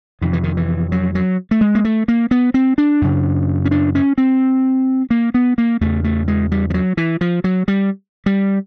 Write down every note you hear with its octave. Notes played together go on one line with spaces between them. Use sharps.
F2 C3 D#3
E3
D#3
E3
F#3
F#3
A3
G#3
A#3
A3
A#3
B3
C4
D4
F#2 C#3
C#4
D4
C#4
C4
A#3
B3
A#3
E2 C#3 A3
A3
G#3
G3
F3
F#3
E3
F3
F#3
G3
G3